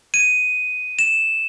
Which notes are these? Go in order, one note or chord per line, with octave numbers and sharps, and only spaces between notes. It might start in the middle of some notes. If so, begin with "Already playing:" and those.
D#7
E7